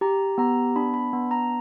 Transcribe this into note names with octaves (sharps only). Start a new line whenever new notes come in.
G4 A#5
B3 A#5
D4 B5
B5
B3
A#5